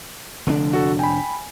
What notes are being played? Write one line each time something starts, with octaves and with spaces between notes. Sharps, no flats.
F1 A#2 D3 D4
F#4 A4
G5 G#5 B5